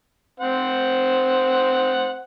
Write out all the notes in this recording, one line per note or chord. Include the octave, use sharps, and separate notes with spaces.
C4 C5 F#5